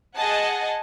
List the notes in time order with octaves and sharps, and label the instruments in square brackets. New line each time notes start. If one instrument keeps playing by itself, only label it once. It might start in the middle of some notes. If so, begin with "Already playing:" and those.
[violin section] G#4 D#5 F#5 G#5 A5